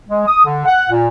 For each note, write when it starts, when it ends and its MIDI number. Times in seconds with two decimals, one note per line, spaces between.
0.09 0.23 56
0.26 0.45 87
0.45 0.61 50
0.65 0.90 78
0.90 1.08 46